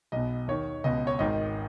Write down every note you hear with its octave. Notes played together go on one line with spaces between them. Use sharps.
B1 B2 D#5
D#2 D#3 C#5
C#2 B2 D#5
C#5
G#1 G#2 D#3 D#5